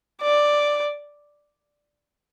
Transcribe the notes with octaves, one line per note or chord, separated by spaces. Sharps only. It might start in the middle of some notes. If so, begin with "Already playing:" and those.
D5